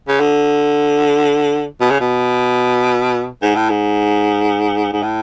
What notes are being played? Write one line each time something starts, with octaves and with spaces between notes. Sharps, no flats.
C#3
D3
B2
C#3
B2
G#2
A2
G#2
G#2
A2